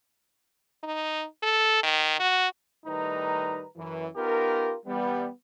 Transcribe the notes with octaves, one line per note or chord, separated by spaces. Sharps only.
D#4
A4
D#3
F#4
A2 D#3 G3 D#4 B4 A#5
F#2 E3
B3 D#4 F4 G4 A#4
E3 G3 B3